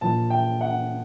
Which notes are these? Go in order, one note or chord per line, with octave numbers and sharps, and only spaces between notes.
A#2 F3 A5
G5
F#5